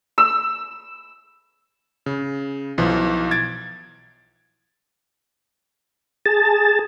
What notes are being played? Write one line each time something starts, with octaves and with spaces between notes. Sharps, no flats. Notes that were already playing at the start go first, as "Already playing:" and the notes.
E6
C#3
B1 E3 F3
G#6 A6 D7
G#4 A5